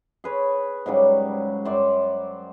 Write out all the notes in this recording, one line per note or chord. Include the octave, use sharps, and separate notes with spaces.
G#4 B4 C#5
G#2 C#3 F#3 G3
F#2 C5 D5 C#6